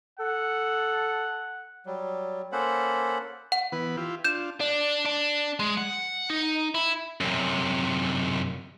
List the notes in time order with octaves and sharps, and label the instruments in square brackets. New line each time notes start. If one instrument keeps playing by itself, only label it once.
[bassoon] A4 [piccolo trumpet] F#5
[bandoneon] F#3 G3
A#3 C#4 A4 C5 F#5 B5
[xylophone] F#5
[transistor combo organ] E3 B3 B4
E4 F4 G4
[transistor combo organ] D4 F4 [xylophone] G6 E7
[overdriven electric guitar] D4
D4
G#3
F#5
D#4
E4
[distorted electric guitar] F#2 C3